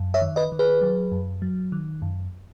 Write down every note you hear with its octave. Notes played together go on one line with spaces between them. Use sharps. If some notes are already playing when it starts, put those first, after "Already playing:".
Already playing: F#2
C#5 E5
D#3
B4 D#5
D#3
G#4 B4
F#3
F#2
F#3
D#3
F#2